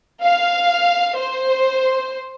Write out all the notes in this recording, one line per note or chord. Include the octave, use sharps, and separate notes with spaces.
F5
C5